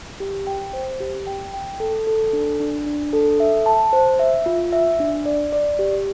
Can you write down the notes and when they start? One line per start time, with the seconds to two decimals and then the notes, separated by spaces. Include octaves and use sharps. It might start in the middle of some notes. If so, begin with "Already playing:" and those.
0.20 G4
0.47 G5
0.73 C5
1.00 G4
1.27 G5
1.54 G5
1.80 A4
2.07 A4
2.33 D4
2.60 D4
2.86 D4
3.13 A4
3.40 E5
3.66 A5
3.93 C5
4.19 E5
4.46 F4
4.73 E5
5.00 D4
5.26 D5
5.53 D5
5.79 G4